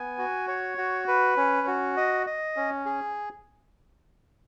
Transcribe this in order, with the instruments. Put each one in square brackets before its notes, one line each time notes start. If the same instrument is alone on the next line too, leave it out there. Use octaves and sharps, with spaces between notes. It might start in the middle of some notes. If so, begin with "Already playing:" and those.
Already playing: [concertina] B3 G#5
F#4
C#5
F#4
B4
C#4
F#4
D#5
D#5
C#4
G#4